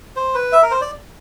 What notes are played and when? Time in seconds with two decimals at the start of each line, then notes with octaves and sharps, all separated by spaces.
0.16 C5
0.35 B4
0.53 E5
0.63 A#4
0.71 C5
0.81 D5